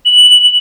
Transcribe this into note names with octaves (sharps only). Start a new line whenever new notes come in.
F#7